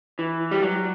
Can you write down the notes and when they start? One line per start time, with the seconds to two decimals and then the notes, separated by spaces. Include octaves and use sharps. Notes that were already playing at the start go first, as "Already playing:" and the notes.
0.19 E3
0.51 G3
0.62 F#3